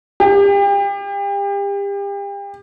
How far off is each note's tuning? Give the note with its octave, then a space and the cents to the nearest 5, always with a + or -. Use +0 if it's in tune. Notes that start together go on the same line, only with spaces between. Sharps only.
G4 +35